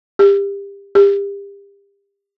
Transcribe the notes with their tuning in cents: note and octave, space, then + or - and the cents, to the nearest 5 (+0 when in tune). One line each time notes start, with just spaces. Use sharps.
G4 +30
G4 +35